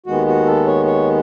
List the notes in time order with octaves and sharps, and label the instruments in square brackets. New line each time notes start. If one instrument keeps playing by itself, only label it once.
[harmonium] D#2 D#3 G#3 B3 F#4
F#4
A4
C#5
C#5